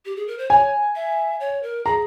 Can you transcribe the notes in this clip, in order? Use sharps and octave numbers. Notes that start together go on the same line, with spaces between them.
G4
G#4
A#4
C5
C#5 G#5
E5
C#5
A#4
G#4 A#5